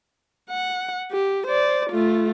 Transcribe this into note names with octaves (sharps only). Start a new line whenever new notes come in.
F#5
G4
C5 D5
A3 F4